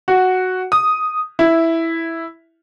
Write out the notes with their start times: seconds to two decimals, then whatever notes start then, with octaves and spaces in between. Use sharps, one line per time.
0.08 F#4
0.72 D#6
1.39 E4